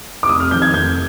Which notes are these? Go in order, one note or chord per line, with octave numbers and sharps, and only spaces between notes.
D6
F1 D#6
F6
F2 D#3 G6
G#6
F1 G6